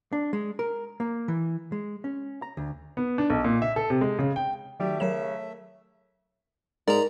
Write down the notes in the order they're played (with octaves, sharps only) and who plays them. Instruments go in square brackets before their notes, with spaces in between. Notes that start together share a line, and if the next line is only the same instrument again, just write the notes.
[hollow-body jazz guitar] D4
G#3
A#4
A#3
E3
G#3
C#4
A#5
D2
[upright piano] B3
D4
B1
A#2
E5
A4
C3
G#3
C#3
G5
[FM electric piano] D#3 F#3 [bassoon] G3 [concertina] A3 E5
[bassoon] C#3 [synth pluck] F#3 E7 [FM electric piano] A#4 C#5
[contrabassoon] G#2 [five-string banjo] A#4 [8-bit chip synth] D5 A#5